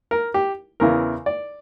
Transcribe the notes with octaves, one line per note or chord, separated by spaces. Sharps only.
A#4
G4
E2 C#3 E3 A#4
D5